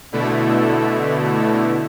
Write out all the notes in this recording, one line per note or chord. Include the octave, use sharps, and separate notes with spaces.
B2 D3 A3 E4